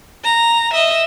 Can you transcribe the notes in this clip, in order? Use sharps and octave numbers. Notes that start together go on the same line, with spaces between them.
A#5
D#5 E5